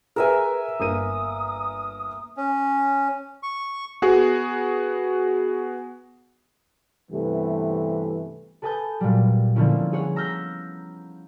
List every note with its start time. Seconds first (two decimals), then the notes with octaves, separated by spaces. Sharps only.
0.16 G#4 A#4 B4 E5 G#5
0.80 G1 A#3 D#6 D#7
2.37 C#4
3.43 C#6
4.02 B3 F#4 G#4
7.12 G2 C3 E3 A3 B3
8.62 A4 B4 G#5 A5 D#6 G6
9.00 A#2 F#3 G3
9.56 D3 F3 A#3 B3 C#4 E4
9.93 G#4 C#5 F#5
10.16 A#5 E6 F6 G6 A#6 B6